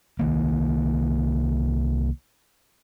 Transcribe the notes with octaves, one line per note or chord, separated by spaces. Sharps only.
C2 D#3 A#3